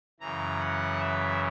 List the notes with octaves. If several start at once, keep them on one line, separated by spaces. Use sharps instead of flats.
F#2 C#3 E3 A#5
F#5
E5